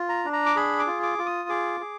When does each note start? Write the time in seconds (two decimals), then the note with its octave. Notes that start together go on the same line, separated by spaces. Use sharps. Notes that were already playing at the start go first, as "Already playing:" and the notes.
Already playing: F4
0.09 A#5
0.25 D4
0.33 A#5
0.46 D6
0.56 G#4 B5
0.79 D6
0.87 F4
1.03 D6
1.18 F4
1.26 D#6
1.49 G#4 D6
1.80 G#4